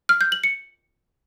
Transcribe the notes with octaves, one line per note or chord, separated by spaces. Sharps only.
F6
G6
F#7
C#7